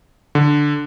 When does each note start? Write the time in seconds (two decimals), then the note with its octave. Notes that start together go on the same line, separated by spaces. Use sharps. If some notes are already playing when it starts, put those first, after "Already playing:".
0.35 D3